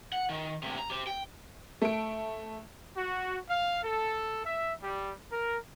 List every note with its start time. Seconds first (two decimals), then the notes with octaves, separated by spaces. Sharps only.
0.13 F#5
0.30 D#3
0.63 D2 C3
0.78 A#5
0.90 G4 C5
1.07 G5
1.82 A3 D7
2.97 F#4
3.49 F5
3.83 A4
4.46 E5
4.83 G3
5.32 A#4